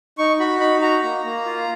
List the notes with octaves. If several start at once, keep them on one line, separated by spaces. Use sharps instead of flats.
D#4 C#6
F#4 B5
D#4 B5
F#4 A#5
A#3
A#3
F4